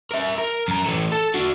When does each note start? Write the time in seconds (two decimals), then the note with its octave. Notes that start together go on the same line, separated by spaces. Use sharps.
0.11 A#4 E5
0.38 A#4
0.68 F#2 A#5
0.86 E3 A3
1.12 A4
1.34 D4 F#4